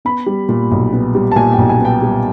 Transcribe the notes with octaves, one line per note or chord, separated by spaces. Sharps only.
B3 B5
G3
A#2
B1
B3
G3
A5
A#2 G#5
G5
B1
G#5
B3 G5
G3